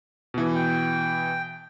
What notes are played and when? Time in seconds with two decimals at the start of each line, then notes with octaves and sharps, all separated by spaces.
0.34 B2 E3
0.55 G5